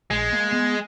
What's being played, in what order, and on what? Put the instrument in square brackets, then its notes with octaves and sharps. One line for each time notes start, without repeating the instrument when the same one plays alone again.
[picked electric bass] A#1 [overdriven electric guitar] G#3
[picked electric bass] A#3
B3